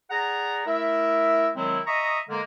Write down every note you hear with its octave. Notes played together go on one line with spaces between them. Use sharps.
G#4 D5 F#5 A#5
A3 E4 A#4 E5
D#3 F#3 G#3 C4 E4
D#5 E5 A#5 C#6 D#6
D3 G#3 A#3